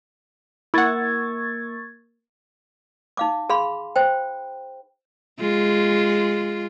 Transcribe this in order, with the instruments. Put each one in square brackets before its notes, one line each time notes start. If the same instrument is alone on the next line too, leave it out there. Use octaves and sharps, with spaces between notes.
[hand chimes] A#3 A#4 E6 [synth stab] E4 F#5 [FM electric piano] C#6 G#6 A6
[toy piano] D#4 F5 D6
G#4 F5 B5 C6
C5 G5
[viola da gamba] G#3 F4